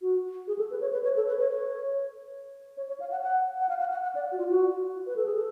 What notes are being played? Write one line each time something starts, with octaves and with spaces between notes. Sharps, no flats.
F#4
G#4
A4
B4
C#5
B4
C#5
A4
B4
C#5
C#5
C#5
F5
F#5
F#5
F#5
F5
F#5
F#5
F#5
D5
F#4
F4
F#4
B4
A4
G#4
A4